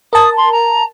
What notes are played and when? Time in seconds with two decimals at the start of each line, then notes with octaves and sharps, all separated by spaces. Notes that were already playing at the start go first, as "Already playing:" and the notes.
0.13 A#4 A5 D#6
0.37 C6
0.52 A#5